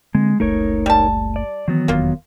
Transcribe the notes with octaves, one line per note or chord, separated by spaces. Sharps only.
D3 G#3 A#3 C4
F#1 C#2 A3 D#4 A#4 C#5
G3 A5
D5
D#3 E3 F#3 B3
F1 E2 A#3 F4